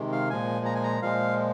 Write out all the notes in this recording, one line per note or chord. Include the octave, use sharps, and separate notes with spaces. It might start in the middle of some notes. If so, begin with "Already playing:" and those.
Already playing: C3 D#3 G#3
F5
A#2 F3 G#3 G#5
A#5
G#5
A#5
A#2 F3 G#3 F5